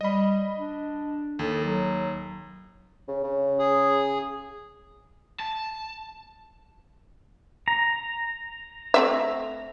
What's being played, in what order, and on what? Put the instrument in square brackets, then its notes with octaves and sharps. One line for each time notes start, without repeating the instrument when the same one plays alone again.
[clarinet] G3 [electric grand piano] D#5 B5
[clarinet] D4
[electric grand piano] D#2 [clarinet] A4
[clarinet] F#3
[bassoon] C#3
C#3
[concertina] G#4
[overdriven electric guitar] A5
[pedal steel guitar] A#5
[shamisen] A3 C4 E5